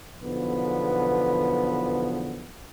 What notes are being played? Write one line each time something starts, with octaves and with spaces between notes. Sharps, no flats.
B1 E2 D3 F3 B3 B4